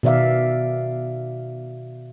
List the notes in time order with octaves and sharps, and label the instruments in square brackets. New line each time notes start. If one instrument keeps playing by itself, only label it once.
[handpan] B2 D#3 D5 E5 F5